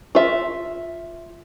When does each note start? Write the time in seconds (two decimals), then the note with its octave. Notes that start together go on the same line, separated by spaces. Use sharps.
0.15 F4 E5